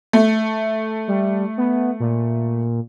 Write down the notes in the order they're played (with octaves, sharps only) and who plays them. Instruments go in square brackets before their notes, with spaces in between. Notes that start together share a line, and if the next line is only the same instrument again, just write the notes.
[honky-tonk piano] A3
[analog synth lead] G3
B3
A#2